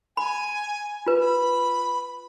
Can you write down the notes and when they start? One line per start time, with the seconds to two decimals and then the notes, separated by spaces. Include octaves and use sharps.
0.17 G#5 B5
1.06 F4 B4
1.21 B5